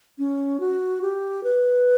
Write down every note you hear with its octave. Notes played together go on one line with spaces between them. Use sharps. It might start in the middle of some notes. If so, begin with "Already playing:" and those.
C#4
F#4
G4
B4